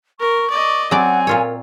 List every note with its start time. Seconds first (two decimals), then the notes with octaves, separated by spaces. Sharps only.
0.20 A#4 C#6
0.50 D5 D#5
0.91 F#3 C4 D5 F#5 G#5
1.27 A#2 F4 A#4 C#5